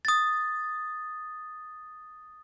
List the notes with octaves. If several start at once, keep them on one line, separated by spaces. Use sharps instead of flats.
D#6 A6